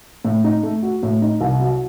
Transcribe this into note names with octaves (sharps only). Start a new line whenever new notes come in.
A2
D#4
A3
F#4
A2
D#4
C2
F#3